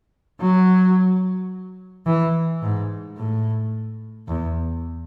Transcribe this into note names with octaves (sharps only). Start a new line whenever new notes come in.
F#3
E3
G#2
A2
E2